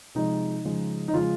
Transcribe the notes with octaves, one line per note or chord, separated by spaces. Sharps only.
C3 F3 G#3 D#4
C#3 F3 G#3
D#4
C#3 F3 G#3 F4